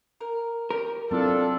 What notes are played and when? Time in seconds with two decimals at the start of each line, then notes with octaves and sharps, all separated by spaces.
0.21 A#4
0.70 G4 A#4
1.11 F#3 C4 D4 E4 F4 A4 A5